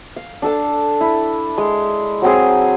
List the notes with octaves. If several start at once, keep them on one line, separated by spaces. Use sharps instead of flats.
F5
D4 A4 A5
E4
G#3
F#3 C4 G#4